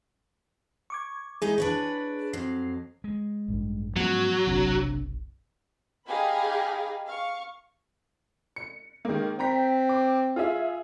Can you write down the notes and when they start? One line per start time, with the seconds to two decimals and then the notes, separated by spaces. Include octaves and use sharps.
0.90 C#6 D6 G#6
1.42 G#3 D#4 E4 G#4
1.58 D4 B4 C#5
2.33 F2 F#3 C7
3.04 G#3
3.48 A1 G2 G3
3.96 G#2 F3 F#3 B3 C#4
4.47 F#1 B1 C3 C4 D4
6.05 D#4 G4 G#4 F5 G#5 B5
7.06 F5 C#6
8.56 C#7
9.05 D#3 G#3 A#3
9.39 C4 G5 A#5 B6
9.89 D6
10.36 F4 G#4 E5